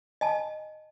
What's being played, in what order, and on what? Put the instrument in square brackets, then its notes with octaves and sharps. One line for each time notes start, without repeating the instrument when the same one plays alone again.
[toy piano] D#5 G#5 A5